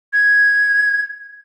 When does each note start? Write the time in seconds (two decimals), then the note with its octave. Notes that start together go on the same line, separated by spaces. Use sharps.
0.13 G#6